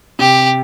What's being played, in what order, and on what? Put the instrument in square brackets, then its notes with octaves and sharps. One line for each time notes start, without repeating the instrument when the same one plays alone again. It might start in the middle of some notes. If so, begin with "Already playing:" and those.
[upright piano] C3 [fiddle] G4